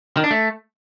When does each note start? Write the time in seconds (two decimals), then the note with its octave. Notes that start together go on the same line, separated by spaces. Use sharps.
0.17 D#3
0.24 D4
0.31 A3